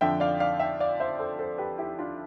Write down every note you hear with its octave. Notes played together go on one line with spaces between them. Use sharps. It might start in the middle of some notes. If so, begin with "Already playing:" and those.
F2 D3 E5 G5
D5 F5
D5 F5
E5 G5
D5 F5
C5 E5
A4 C5
A4 C5
G4 B4
E4 G4
D4 F4